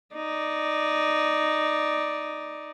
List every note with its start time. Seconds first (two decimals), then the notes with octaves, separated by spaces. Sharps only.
0.14 D#4 D5